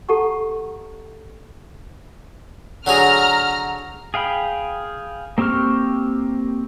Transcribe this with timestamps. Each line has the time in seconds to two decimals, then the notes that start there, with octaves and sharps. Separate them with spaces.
0.09 G4 A4 F#5 A5 A#5 C#6
2.86 D3 F#3 G#4 A#5 F6
4.14 G#4 F5 G5 B5
5.38 A#3 C4 G4 C#6 F6